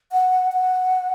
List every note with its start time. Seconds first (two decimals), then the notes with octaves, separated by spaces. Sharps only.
0.12 F#5
0.52 F#5